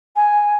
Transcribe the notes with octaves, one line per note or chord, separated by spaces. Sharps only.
G#5